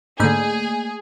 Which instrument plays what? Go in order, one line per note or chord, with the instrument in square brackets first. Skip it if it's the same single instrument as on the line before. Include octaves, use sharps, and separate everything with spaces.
[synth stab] G#2 D3 [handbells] A3 A#3 G6 [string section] G#4